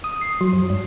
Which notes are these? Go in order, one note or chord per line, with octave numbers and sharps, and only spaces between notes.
D#6
C7
F#3
F#2
G2